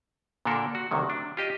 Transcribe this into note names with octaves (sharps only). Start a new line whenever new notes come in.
A#2 D3 A#3 D4 A4 A#4
F#4
D2 C3 D#3 F#3
D4
F4 G4 D#5